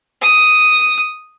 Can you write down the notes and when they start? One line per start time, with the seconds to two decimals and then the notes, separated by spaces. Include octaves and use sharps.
0.22 D#6